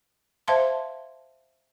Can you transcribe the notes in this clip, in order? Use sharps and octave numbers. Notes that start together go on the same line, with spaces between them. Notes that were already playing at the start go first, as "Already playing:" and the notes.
C5 E5 F5 A5 C6